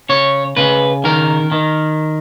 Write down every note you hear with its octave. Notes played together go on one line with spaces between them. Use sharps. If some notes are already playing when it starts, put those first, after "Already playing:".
C#3 C#5
C#3 B4
D#3 A#4
D#3